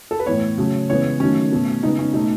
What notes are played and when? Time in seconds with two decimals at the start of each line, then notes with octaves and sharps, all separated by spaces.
0.11 A4
0.19 B4
0.26 A2 E3 B3 C#5
0.58 C#3 F#3 A3
0.90 C#3 E3 G#3 B3 C#5
1.20 D#3 F#3 A3 C#4
1.52 B2 A3
1.83 C#3 G#3 B3 D#4
1.99 C#4
2.14 B2 A3 D#4